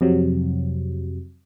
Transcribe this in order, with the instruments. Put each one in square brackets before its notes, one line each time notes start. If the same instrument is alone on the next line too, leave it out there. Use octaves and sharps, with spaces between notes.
[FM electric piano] F2 C3 F#3